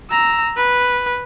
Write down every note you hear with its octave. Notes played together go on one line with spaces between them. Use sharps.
A#5 E6
B4